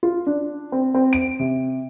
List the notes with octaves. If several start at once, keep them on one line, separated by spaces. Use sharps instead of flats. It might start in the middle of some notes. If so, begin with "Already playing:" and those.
F4
D4
C4
C4
D7
C3